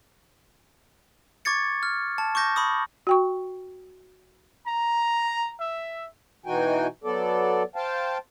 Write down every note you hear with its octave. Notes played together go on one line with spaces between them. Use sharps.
C#6 D6 G#6 A6 C#7
F6
A5
C#6 D6 G6 A#6
B5 C#6 D#6
F#4 G5 C#6
A#5
E5
B2 E3 D#4 F#4 G5 G#5
F#3 B3 A4 D5
C5 F5 G5 A5